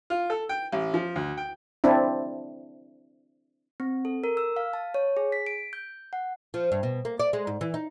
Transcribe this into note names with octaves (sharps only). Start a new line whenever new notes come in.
F4
A4
G5
A1
F3
D2
G5
C4 D4 E4
C4
A4
A#4
E6
F5
A5
C#5
G#4
B6
D7
G6
F#5
F3
G2
B2
A#3
D5
G#3
G#2
E3
D#4